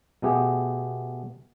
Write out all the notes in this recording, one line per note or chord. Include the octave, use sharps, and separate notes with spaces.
B2 A3 B3 G4 G#4